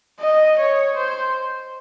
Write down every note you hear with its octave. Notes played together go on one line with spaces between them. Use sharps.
D#5
C#5
C5